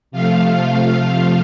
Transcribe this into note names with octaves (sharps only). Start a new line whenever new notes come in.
C3 F3 A3 F4 F5
F4 F5